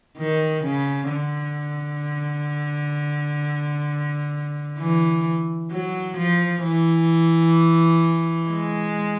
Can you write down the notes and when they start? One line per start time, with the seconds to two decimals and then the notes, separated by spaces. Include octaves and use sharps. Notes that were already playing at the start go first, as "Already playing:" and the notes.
0.17 D#3
0.64 C#3
1.10 D3
4.79 E3
5.71 F#3
6.17 F3
6.63 E3
8.49 G#3